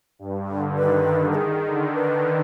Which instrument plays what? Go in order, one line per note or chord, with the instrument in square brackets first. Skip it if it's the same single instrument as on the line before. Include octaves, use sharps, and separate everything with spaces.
[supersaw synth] G2
D3
[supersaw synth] D#3 [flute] B4
[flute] B4
[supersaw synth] D#3 [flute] G#4
[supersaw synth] D3
[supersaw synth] D#3 [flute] B4